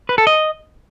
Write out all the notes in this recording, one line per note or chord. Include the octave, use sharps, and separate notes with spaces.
B4
A4
D#5